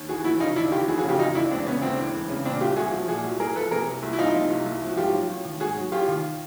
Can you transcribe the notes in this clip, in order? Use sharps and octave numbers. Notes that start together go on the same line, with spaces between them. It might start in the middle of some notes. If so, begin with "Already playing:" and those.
Already playing: D#2
E3 F#4 G#4
F1 E4 F#4
C#3 D#4 F4
D#2 D4 E4
E3 F4 G4
F1 F#4 G#4
F#4 G#4
C#3
F4 G4
D2 D#4 F4
E3 D4 E4
E1 C4 D4
C#3 B3 C#4
D2 C4 D4
E3
E1
C#3
A#2 C4 D4
C2 F4 G4
C2 F#4 G#4
F3
A#2 F#4 G#4
C2
C2 G#4 A#4
F3 A4 B4
C3 G#4 A#4
C2
C2
E4
F3 D#4 F4
C3
C2
C2
F3
F#4
G#2 F4 G4
F#3
A1
D#3
G#2 F#4 G#4
F#3
A1 F4 G4
D#3